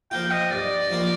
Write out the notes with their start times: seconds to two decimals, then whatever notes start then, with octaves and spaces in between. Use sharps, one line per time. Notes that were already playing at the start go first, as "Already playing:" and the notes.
0.11 F3 A#3 F4 G5
0.31 D#5
0.51 G2 D5
0.90 F3 A#3 F4